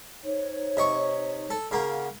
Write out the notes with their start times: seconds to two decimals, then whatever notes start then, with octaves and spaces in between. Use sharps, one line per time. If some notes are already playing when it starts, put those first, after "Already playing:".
0.23 D#4 C5 C#5
0.77 C3 D#5 C#6
1.50 A4
1.71 C#3 A#3 F#5